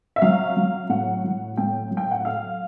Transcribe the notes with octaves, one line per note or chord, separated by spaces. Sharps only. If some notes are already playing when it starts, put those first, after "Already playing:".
E5
F#3 F5
F#3
A2 F#5
F#3
A2 G5
F#3
G5
F#5
A3 F5